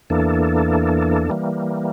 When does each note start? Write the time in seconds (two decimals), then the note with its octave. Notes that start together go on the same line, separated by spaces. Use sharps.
0.10 E2 E3 A#3 D4 A4
1.30 E3 G3 A#3